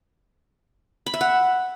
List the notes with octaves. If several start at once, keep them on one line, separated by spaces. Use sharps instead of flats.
B5
E5
F#5